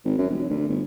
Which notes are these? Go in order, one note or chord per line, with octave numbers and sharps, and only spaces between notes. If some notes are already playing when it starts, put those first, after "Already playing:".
G#1
F#2
F1
D2
G1